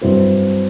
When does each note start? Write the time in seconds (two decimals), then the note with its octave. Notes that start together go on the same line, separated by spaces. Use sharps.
0.01 G2 F#3 C4 E4